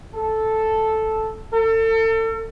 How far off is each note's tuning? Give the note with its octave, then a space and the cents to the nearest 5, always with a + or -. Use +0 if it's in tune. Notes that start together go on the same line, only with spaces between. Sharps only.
A4 -5
A4 +35